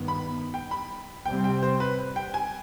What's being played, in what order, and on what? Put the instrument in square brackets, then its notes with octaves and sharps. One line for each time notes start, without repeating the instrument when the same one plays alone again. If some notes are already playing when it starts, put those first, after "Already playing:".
Already playing: [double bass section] G2 D#3 B3
[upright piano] B5
G5
B5
[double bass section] C3 G3 C4 [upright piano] G5
[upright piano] G5
C5
B4
G5
G#5